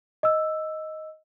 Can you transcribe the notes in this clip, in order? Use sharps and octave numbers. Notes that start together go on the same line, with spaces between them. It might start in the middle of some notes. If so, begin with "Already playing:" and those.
D#5 E6